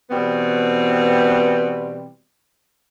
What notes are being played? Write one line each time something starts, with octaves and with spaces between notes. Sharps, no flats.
B2 E3 G3 B3 C4